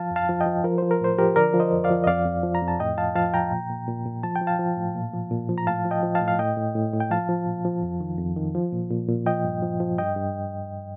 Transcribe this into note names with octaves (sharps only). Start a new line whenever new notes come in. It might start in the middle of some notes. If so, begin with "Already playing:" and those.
Already playing: F3 F5 A5
F2
F5 A5
F3
D#5 G5
F3
F3 A#4
F3 C5
A#4
A2 C5
F3 G4 A#4
D3 A#4 D5
F3
C5 D#5
F2
D5 F5
F3
D#5
F2 D5 F5
F2
F3
A#5
F2
A5
A2 D#5 G5
F3 F5 A5
F3 F5 A5
F3 G5 A#5
A#2
A#2
A#2
A#2
F3 A5
G5
F3
F5 A5
F3
A2
A#2
F3
A#2
F3
A#5
A2 F5 A5
F3
D#5 G5
F3
F5 A5
A2
F5
A2 D#5 G5
A2
A2
A2
G5
F3 F5 A5
F3
A#2
F3
F2
D#3
F2
D#3
F3
A#2
A#2
A#2
F3 D#5 G5
G2
F3
F3
G2 D#5 G5
G2